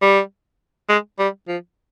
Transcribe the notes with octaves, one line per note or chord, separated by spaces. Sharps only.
G3
G#3
G3
F3